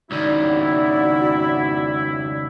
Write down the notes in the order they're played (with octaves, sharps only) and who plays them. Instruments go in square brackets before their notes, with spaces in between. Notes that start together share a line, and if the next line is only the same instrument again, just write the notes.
[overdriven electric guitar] C#2 D#3 [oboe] E4 [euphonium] F#4 [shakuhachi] D5